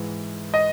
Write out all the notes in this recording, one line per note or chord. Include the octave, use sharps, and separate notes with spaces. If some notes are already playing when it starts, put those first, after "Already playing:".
Already playing: G#2 E3
D#5